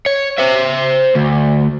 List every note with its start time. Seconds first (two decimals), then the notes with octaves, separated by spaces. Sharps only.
0.06 C#5
0.38 C5 E5
1.15 D2